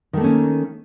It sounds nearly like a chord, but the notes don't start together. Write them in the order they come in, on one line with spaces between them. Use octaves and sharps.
D#3 A3 A#3 C#4